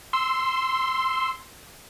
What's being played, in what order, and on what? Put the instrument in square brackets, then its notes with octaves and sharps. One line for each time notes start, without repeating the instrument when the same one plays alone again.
[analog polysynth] C6 E6